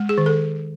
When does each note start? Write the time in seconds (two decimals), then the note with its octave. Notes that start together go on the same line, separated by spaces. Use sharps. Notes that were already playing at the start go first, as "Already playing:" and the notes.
Already playing: G#3
0.09 G#4
0.18 D#3
0.26 A4